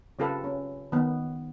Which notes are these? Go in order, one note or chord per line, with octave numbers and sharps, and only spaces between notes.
C#3 C4 F4 G4 A4 B4
C#4
D#3 B3